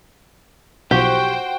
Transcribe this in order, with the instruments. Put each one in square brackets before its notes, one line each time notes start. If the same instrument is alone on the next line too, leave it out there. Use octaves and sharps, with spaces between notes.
[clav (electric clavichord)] B1 F3 [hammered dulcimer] F#4 [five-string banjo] G4 [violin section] C5 G5